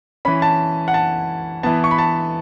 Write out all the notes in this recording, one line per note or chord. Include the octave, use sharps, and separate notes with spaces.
E3 C#4 B5
A5
F#5
A5
E3 B3 A5
C#6
B5
A5